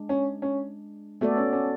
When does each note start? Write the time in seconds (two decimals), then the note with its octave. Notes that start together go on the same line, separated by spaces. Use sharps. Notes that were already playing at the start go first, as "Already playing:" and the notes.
Already playing: G#3 D4
0.09 C#4
0.42 C#4
1.21 A3 B3 F#4 A4 D5
1.37 C#4
1.53 C#4